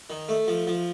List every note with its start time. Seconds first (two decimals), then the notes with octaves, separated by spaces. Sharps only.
0.10 D#3
0.29 A3
0.48 F3
0.67 F3